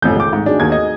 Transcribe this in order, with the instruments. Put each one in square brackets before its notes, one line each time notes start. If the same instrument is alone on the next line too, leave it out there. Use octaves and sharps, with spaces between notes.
[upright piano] A1 F2 G6 [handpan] D#3 A3 C4
[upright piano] C#2 D6
G#2
[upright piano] D4 [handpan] D#4 F#4 G#4
[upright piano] D#2 D#3 G#6
D#5